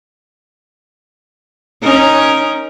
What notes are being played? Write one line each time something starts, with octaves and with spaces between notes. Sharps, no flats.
C#4 D#4 A#4